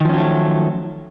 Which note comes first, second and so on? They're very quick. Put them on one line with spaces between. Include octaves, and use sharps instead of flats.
D#3 F3 C#4 F#3 A3